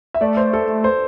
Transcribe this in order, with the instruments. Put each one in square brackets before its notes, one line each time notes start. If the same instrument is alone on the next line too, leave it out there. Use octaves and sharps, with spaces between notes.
[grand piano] E5
[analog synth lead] A3 [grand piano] D5
[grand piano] C5
A4
C5